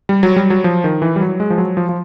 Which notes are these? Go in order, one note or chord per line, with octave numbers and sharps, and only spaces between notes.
G3
F#3
G3
F#3
F3
D#3
E3
G3
F#3
G#3
F3
F#3
F3
F3